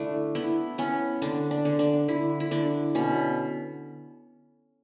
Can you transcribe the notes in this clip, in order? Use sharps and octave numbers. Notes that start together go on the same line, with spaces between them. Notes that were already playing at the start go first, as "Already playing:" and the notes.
Already playing: D3 A3 D4 E4
B3 E4
B3 C#4
D3 D4
D4
D3
D4
D3 E4
E4
D3 D4
B2 C#4